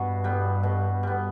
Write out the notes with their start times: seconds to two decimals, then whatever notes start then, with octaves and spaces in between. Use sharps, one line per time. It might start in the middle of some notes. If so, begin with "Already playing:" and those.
Already playing: G2 B2
0.24 G3 B3
0.63 B2
1.03 G3 B3